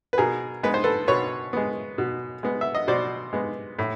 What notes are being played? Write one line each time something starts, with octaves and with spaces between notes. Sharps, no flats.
B4
B2 G#4 A#4
G#3 B3 B4
C5
A4 B4
B2 B4 C#5
G#3 B3
B2
G#3 B3
E5
D#5
B2 C5 D5
G#3 B3
A2